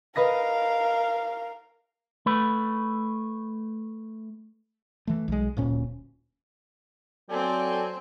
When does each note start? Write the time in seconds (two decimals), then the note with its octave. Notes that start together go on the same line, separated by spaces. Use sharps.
0.16 A#4 B4 D#5 F5 A#6
2.26 A3 B4
5.07 E3 A3
5.28 B1 G#3
5.57 D1 A#2 C#4
7.30 F#3 C4 A4 D5 G#5